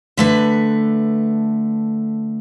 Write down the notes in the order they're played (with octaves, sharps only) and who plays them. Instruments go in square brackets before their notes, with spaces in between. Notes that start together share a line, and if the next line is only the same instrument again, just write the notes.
[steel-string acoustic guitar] D3 A3 B4